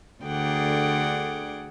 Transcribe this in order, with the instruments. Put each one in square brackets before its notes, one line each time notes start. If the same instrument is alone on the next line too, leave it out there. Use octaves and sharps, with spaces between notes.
[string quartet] D2 D3 G#4 F#5 G5 D6